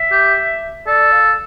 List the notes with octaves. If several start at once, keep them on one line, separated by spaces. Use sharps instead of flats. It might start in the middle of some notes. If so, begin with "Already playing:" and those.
Already playing: E5
G4
A4 D5
F5